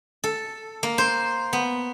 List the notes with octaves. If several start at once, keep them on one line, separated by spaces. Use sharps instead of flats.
A4
A#3
C5
B3